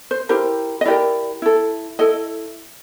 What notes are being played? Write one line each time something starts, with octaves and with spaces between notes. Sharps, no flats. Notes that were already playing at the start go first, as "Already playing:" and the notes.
C5
E4 G4 A#4 C5
D#5
E4 G4 A#4 D5
E4 A4
E4 A4 D#5